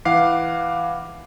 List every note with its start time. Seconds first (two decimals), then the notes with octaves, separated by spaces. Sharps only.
0.05 E3 F5 F#5 D6 C7